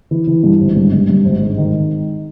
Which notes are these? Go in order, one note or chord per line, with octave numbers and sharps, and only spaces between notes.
E3
E3
G2
G#1
G2
G2
G2
G#1
G#2
D#3